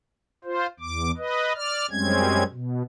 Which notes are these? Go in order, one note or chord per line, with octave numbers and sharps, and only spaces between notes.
F4 C5
E2 D6
B4 D#5
D5 F6
F#2 G3 G#3 C4 C#4 G#6
B2